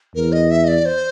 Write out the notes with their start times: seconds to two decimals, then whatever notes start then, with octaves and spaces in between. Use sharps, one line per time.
0.15 E2 A#4
0.32 D#5
0.51 E5
0.64 D#5
0.68 D5
0.85 C5